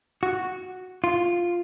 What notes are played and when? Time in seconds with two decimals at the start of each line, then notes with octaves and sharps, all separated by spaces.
0.23 F#4
1.04 F4